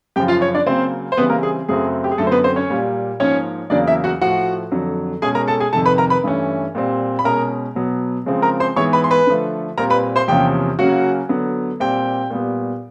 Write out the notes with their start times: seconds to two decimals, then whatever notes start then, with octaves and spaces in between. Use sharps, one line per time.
0.16 F#2 C#3 F3 G4 G5
0.28 F4 F5
0.41 C#4 C#5
0.55 D4 D5
0.66 C#3 F#3 A#3 C4 C5
1.12 C5
1.17 C#3 E3 G3 B3 C4 B4
1.30 A#3 A#4
1.43 G#4
1.69 F#2 C#3 F#3 A3 C4 G#4
2.04 G4
2.11 G#4
2.18 F#2 D3 F#3 A3 A4
2.27 C5
2.31 B3 B4
2.44 C4 C5
2.56 C#4 C#5
2.70 A#2 G3 A#3
3.20 G#2 F3 A#3 C#4 C#5
3.70 E2 C#3 F#3 A#3 D4 D5
3.87 E4 E5
4.04 F#4 F#5
4.21 A2 F3 A3 F#4 F#5
4.72 F2 D3 F#3
5.22 B2 G#3 C#4 G#4 G#5
5.35 A#4 A#5
5.48 A4 A5
5.60 G#4 G#5
5.73 F2 C3 D#3 G3 A4 A5
5.86 B4 B5
5.98 A#4 A#5
6.10 B4 B5
6.24 G2 E3 A3 C#4
6.75 A#2 G3 C4
7.19 B5
7.24 B2 G#3 C#4 A#4 A#5
7.75 B2 F#3 B3
8.26 C#3 F3 G#3 C4
8.42 A#4 A#5
8.60 C5 C6
8.76 G#2 E3 G#3 B3 C#5 C#6
8.93 B4 B5
9.04 C6
9.11 B4 B5
9.27 D3 F3 A3
9.78 A#2 G3 C4 A#4 A#5
9.90 B4 B5
10.16 C5 C6
10.28 E2 C3 F3 A#3 C#4 G4 G5
10.79 C#3 F#3 A#3 C#4 F#4 F#5
11.29 D3 F#3 B3
11.80 A#2 G3 C4 G4 G5
12.30 A#2 G3 B3